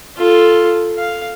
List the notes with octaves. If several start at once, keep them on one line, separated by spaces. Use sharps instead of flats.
F4 A4
F5